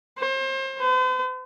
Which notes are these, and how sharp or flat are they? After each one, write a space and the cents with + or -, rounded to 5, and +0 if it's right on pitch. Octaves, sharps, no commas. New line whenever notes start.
C5 +35
C5 -45